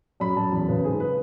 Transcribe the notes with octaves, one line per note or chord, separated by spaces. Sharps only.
F#2 B5
F#2 A5
E2
C#3 B4
G#2 G#4
B4